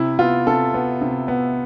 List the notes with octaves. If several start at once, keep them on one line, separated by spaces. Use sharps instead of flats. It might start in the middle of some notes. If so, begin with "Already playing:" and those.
Already playing: C3 E4
B3 F4
C3 A4
B3
C3
B3